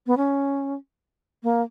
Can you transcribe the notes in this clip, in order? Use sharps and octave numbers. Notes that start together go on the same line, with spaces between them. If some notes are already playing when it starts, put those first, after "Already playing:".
B3
C#4
A#3